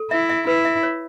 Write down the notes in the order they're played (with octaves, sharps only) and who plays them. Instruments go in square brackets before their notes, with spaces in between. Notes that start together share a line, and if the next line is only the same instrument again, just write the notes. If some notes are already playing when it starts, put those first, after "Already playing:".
Already playing: [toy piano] A4
[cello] E4 [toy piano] E5
[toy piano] E5
[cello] E4 [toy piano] B4
[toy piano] E5
C#5